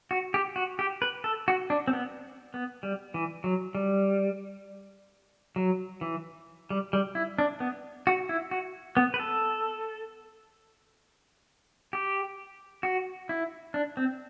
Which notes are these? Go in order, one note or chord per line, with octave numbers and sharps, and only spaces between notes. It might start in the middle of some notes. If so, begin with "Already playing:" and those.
F#4
G4
F#4
G4
B4
A4
F#4
D4
C4
B3
B3
G3
E3
F#3
G3
F#3
E3
G3
G3
E4
D4
B3
F#4
E4
F#4
B3
B4
A4
G4
F#4
E4
D4
C4